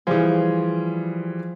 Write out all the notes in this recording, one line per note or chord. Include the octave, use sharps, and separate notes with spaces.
E3 F3 G3 G#4